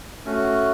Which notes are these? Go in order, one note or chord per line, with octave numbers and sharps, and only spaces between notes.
A3 C#4 F#4